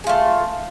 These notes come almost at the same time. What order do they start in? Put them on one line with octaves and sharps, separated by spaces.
G#4 F4 A3